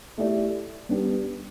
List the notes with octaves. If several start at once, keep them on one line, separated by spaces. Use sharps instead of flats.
A3 E4 G4 D5
G3 B3 D4 G4